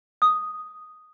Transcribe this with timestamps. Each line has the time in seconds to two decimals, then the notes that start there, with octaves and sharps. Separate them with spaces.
0.22 D#6